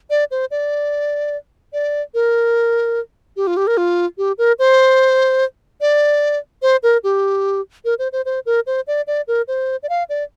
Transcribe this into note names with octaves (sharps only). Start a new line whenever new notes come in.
D5
C5
D5
D5
A#4
G4
F4
G4
A#4
F4
G4
A#4
C5
D5
C5
A#4
G4
A#4
C5
C5
C5
A#4
C5
D5
D5
A#4
C5
D5
F5
D5